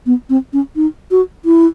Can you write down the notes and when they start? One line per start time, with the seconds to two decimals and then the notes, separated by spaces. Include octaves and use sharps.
0.06 B3
0.29 C4
0.53 C#4
0.76 D#4
1.11 F#4
1.45 E4